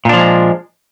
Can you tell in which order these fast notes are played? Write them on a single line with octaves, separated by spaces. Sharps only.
A#2 D4 F3 G#3